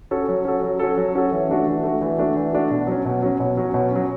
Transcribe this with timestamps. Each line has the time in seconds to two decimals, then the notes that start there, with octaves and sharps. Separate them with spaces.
0.11 C#4 F#4 A4
0.28 F#3
0.45 C#4 F#4 A4
0.63 F#3
0.79 C#4 F#4 A4
0.97 F#3
1.15 C#4 F#4 A4
1.32 E3
1.50 A3 D4 F#4
1.67 E3
1.83 A3 D4 F#4
2.01 E3
2.19 A3 D4 F#4
2.36 E3
2.53 A3 D4 F#4
2.71 B2
2.87 F#3 C#4
3.05 B2
3.22 F#3 C#4
3.40 B2
3.57 F#3 C#4
3.74 B2
3.91 F#3 C#4